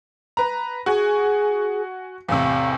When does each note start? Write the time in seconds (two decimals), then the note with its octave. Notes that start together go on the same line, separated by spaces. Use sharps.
0.37 B4 A#5
0.86 F#4 G#4 G#5
2.29 E2 A2 C3 F5